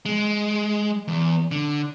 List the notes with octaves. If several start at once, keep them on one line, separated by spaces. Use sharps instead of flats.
G#3
E2
D3